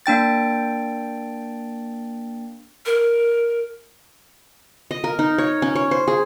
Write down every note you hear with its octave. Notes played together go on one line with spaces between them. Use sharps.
A#3 D4 G5 A6
A#4
D#5
A#4
D#4
C#5
C#4
C#5
C5
G#4